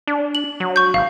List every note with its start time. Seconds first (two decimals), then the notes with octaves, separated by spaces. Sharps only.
0.07 D4
0.35 F#7
0.60 F#3
0.76 C#6 G6
0.94 G#1 F5